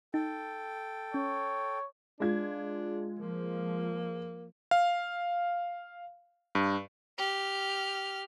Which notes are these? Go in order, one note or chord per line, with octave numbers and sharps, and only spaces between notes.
D#4 A4 G5
C#4 C#5
G#3 D4 F4 G#6
F3 A#3
F5
G2
G4 F6